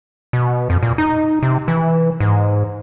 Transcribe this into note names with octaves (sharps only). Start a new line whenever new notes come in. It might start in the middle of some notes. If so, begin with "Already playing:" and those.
B2
F2
A#2
D#4
C3
E3
G#2